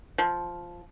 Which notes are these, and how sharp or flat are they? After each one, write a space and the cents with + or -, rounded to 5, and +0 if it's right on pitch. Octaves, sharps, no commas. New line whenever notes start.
F3 +0